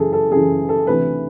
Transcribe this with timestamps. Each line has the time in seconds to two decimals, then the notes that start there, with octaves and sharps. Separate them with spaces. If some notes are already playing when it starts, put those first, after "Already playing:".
Already playing: F#2 C#3 E3 G#4 A4
0.13 A4
0.31 F#2 C#3 E3 G#4
0.69 A4
0.87 D2 C3 E3 B4